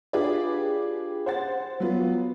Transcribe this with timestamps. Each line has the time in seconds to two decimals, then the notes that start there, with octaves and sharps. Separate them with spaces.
0.13 D4 F4 G4 G#4 B4 D5
1.26 C5 F#5 A6
1.80 F#3 B3 F4